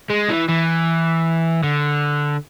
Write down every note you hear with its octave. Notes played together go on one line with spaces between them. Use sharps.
G#3
E3
E3
D3